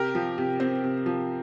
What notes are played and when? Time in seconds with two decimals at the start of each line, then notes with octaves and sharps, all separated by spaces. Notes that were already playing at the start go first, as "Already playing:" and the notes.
Already playing: C3 G4 A#4
0.15 F3
0.38 C3
0.60 C4
0.84 C3
1.06 F3